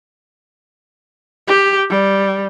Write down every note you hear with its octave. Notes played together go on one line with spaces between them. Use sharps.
G4
G3